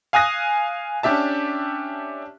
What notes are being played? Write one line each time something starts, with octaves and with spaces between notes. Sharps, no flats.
F5 G#5 D#6 F#6 A#6
C#4 D4 G4 E5 A5